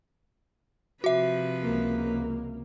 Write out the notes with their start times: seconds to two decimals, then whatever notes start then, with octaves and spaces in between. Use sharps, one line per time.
1.04 C3 F3 F#4 B4 E5
1.62 C#2 A#3